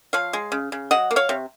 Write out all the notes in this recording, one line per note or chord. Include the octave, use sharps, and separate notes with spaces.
F3 C#5 F5
G#3
C#3
C#3
F#3 D#5 F#5
A#3
C#5 F5
C3